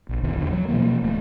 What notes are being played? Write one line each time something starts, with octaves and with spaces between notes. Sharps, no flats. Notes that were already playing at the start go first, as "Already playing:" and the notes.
A#1
G1 C2 B2 D#3
E2 D3
F#3
B2 E3 F3 A#3
D1 A3